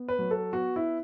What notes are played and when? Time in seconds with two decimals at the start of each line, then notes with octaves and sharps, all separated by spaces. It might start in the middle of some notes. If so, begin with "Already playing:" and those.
Already playing: B3
0.08 B4
0.19 F#3
0.31 A4
0.53 B3 F#4
0.76 E4